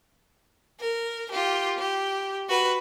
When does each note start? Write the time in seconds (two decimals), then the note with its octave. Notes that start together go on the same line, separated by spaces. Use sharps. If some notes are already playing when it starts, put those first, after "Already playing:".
0.81 A#4
1.31 F4 G4
1.79 G4
2.49 F#4 B4